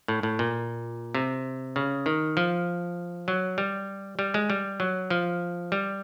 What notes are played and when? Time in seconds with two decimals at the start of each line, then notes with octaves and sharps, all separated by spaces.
0.08 A2
0.23 A2
0.39 A#2
1.15 C3
1.76 C#3
2.06 D#3
2.37 F3
3.28 F#3
3.58 G3
4.19 G3
4.34 G#3
4.50 G3
4.80 F#3
5.10 F3
5.72 G3